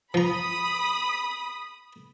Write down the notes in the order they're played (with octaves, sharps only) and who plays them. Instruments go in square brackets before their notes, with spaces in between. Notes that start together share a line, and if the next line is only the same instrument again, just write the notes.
[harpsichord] F3 A#5 [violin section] B5 D#6